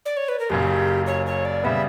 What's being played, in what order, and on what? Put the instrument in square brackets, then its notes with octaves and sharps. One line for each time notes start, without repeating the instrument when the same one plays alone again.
[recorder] D5
C#5
B4
A#4
[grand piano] F#1 F#2 C#3 [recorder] G4
[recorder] C#5
C#5
D5
[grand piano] C#3 G3 B3 [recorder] E5